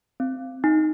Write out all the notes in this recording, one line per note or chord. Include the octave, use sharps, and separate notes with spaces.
C4
D#4